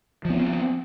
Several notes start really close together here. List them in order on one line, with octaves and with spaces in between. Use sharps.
F3 B3 C4